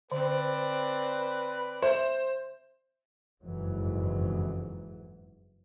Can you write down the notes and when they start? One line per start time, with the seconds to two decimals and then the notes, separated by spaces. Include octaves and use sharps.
0.12 D3 C4 B4 D5
1.82 C5 E5
3.43 F#1 F2 G#2 E3 F#3